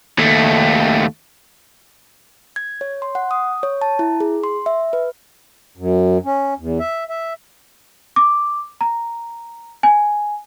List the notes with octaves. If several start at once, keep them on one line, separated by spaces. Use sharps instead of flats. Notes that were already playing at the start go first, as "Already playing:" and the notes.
D#2 A3
G#6
C#5
C6
F#5
D#6
C#5
A5
E4
G#4
C6
E5
B4
F#2
C#4
E2
E5
E5
D6
A#5
G#5